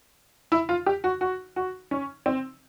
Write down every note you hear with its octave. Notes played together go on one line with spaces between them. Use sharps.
E4
F4
G4
F#4
F#4
F#4
C#4
C4